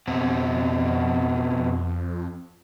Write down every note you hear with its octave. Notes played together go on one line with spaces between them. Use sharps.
F2 B2 C4